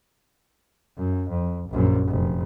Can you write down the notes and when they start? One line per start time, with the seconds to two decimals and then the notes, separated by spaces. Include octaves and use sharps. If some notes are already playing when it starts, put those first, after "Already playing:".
0.97 F#2
1.29 F2
1.69 A#1 F#2
2.08 F1